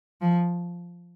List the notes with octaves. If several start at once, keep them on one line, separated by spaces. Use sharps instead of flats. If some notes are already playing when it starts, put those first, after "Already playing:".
F3